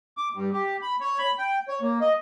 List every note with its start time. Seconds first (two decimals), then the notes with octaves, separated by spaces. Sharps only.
0.17 D6
0.34 G2
0.53 G4
0.82 B5
1.00 C#5
1.19 B5
1.38 G5
1.68 C#5
1.81 A#3
2.01 D#5